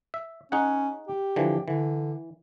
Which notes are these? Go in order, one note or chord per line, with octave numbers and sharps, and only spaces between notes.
E5
C#4 D#4 G#4 F#5
G4
D3 E3 F3
D3 E3